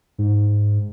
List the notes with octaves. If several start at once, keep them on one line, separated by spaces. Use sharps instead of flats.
G#2